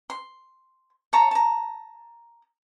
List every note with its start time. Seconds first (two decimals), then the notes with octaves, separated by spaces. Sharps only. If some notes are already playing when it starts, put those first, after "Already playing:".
0.10 C6
1.13 C#5 A5 A#5
1.31 A5 A#5